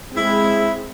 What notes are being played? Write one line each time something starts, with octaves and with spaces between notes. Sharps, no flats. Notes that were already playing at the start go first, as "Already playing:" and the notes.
G#3 C4 E4 G#4